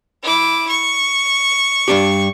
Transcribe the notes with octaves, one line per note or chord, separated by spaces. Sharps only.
E4 D6
C#6
G2 D4 G4